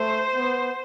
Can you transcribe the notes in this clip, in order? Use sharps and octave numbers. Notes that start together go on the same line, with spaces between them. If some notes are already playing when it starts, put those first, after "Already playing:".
Already playing: A3 C5
B3